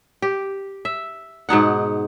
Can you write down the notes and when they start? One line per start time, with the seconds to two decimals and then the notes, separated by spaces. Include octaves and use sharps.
0.22 G4
0.85 E5
1.49 G#2 B2 D#4 F#5